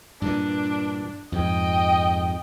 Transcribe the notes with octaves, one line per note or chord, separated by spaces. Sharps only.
G2 A#2 E3 D4
F2 G#2 D#5 G5